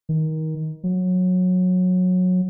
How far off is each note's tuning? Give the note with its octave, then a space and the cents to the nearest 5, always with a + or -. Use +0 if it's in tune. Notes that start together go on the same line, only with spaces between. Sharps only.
D#3 +20
F#3 -20